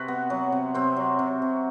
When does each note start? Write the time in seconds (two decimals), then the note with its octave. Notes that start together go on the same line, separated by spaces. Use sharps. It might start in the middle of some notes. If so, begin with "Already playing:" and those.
Already playing: C3 F#4 B4
0.08 B3
0.30 F#3
0.52 C3
0.74 C3 C4 C5
0.96 F#3
1.19 C3
1.42 C3